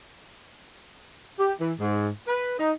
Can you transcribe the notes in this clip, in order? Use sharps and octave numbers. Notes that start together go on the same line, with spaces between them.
G4
E3
G#2
B4
D#4